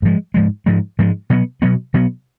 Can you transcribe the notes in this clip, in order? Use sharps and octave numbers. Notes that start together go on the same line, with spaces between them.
G#2 F3 G#3
G#2 F3 G#3
G#2 F3 G#3
G#2 F3 G#3
B2 F#3 B3
B2 F#3 B3
B2 F#3 B3